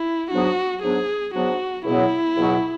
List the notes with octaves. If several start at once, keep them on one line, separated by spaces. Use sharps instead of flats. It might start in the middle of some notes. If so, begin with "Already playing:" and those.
Already playing: E4
G#2 F#3 B3 D4 F#4
G#2 F#3 B3 D4 G#4
G#2 F#3 B3 D4 F#4
C#2 B2 F#3 B3 E4
C#2 B2 F#3 B3